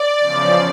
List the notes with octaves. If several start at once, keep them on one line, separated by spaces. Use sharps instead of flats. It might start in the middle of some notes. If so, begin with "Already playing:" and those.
Already playing: D5
E2 C#3 F3